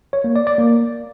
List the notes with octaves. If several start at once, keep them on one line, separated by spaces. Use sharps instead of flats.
C#5
A#3
D5
D5
A#3